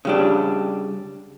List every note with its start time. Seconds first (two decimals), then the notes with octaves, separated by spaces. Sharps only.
0.05 C#3 G3 D4